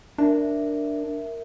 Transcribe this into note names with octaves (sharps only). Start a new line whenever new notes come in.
D4 A#4 E5